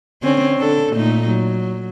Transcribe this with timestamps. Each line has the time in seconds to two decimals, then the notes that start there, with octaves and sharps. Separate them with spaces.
0.22 D3 C4 C#4
0.58 D3 D4 A4
0.93 A#2 A3 D#4
1.28 F#3